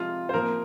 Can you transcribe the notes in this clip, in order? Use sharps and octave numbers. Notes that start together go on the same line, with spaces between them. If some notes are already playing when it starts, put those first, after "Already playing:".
Already playing: C3 F3 G#3 F4
C5
C3 F3 A#3 A#4